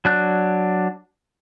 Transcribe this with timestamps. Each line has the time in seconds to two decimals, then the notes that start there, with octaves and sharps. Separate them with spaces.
0.05 F#3 D4 F#6